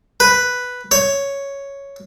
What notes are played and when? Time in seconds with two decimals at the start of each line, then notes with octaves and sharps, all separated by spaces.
0.20 B4
0.91 C#5